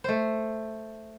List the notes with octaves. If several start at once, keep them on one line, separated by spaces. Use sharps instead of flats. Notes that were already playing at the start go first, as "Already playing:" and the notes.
A3 C5